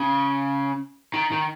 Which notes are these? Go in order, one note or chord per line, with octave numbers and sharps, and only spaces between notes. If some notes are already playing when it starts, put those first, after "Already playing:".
Already playing: C#3
D#3
D#3